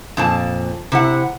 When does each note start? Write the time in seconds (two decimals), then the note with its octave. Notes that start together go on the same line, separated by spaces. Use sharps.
0.17 F2 A#2 A5
0.92 C3 E4 F#5